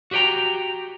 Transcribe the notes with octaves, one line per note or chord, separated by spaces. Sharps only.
F#4 G4 B4 G5 A#5